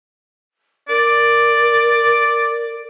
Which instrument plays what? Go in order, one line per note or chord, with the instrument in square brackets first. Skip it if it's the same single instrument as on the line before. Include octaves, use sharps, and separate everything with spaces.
[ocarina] A#4 [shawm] D5